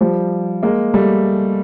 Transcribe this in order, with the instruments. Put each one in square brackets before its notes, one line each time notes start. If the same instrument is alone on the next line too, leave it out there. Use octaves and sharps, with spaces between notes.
[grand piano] F3 G3
G#3 A#3
G3 A3